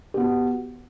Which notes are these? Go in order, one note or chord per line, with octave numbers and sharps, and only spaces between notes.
B3 F#4 G4